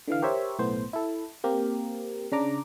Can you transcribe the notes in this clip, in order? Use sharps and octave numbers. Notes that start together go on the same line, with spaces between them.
D3 E3 F5
G4 A#4 C5 C#5 E5
B1 A2 A3 B3 C5
E4 A4
A#3 C4 G4 A#4
C#3 D4 A#5 D6